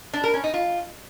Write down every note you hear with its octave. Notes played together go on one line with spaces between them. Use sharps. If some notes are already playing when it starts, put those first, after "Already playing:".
D4
A#4
C#4
D#4
F4